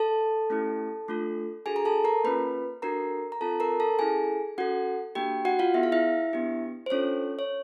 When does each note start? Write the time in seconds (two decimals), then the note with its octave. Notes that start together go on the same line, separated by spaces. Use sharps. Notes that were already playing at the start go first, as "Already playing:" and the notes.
Already playing: A4 A5
0.50 A3 C#4 E4 G4
1.08 A3 D4 F4 A4
1.66 D4 F#4 G#4 A4 G#5
1.76 A#5
1.85 A4 A5
2.04 A#4 A#5
2.24 A#3 C#4 F4 B4 B5
2.82 D4 F#4 A4 A#4 A#5
3.32 A#5
3.41 C4 F4 A4 A5
3.60 A#4 A#5
3.80 A4 A5
3.99 C#4 E4 G#4 A4 G#5
4.58 C#4 F#4 A4 F#5
5.15 A#3 D4 F#4 G4 G5
5.45 F#4 F#5
5.59 F4 F5
5.74 B3 E4 G#4 E5
5.83 F5
5.92 E4 E5
6.33 B3 D4 G4
6.86 C5
6.90 C#4 D4 F4 A4 C#5
7.39 C#5